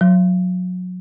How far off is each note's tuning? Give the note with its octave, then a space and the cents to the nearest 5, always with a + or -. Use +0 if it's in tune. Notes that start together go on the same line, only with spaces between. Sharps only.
F#3 -25